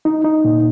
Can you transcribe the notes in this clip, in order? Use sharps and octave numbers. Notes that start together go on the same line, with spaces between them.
D#4
D#4
A#2